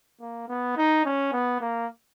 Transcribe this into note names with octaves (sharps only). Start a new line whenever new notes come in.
A#3
B3
D#4
C#4
B3
A#3